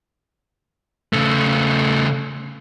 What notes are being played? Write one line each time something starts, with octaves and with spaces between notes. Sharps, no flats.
C#3 A3